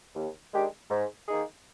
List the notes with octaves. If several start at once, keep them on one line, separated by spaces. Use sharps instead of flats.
D#2
D#3 G#3 D4 G4
G#2
D#3 A#3 D#4 G#4